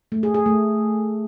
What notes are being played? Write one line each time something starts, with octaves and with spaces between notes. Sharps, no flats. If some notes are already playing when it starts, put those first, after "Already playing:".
A3
G#4
G#4
A3